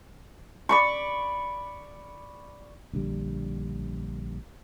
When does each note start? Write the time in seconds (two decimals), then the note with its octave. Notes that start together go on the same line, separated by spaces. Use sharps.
0.69 D5 B5 C#6
2.93 A#1 D3 G3